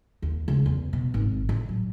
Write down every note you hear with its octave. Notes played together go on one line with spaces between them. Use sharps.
D#2
C#2
E2
B2
G#1
A1
F#3